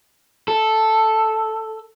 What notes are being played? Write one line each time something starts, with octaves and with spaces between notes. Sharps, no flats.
A4